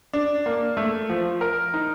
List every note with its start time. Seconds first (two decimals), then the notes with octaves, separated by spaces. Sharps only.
0.13 D4
0.46 A#3
0.77 A3
1.09 F3
1.41 A#4
1.74 D#4